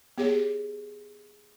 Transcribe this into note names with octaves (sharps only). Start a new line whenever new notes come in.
B3 G4 G#4 C#5